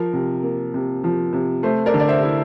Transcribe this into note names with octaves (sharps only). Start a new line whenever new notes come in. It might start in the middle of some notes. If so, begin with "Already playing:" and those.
Already playing: F3 A#4
C3
A#3
C3
F3
C3
A3 C5
A#4 D5
D3
D5
C5 E5
E4